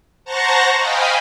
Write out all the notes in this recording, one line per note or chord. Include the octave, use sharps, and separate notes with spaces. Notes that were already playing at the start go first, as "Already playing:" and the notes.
C5 F#5 A5 A#5 C#6 A#6
D#5 F5 G5 G#5 B5